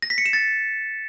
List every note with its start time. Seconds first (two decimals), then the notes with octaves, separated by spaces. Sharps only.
0.02 A#6
0.10 B6
0.18 C#7
0.26 E7
0.33 A6